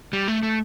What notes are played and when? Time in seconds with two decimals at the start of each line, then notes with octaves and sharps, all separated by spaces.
0.13 G3
0.28 A3
0.43 A3